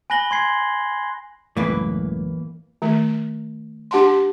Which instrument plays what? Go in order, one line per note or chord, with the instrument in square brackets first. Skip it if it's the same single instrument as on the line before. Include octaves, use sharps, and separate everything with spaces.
[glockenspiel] G#5 B5 F#6 A#6 F#7 G7
C6 G#6 C7
[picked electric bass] C#2 F#2 A2 [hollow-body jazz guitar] E3 A#3 B4
[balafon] D#3 A3
D4 G4 F#5 A5 C6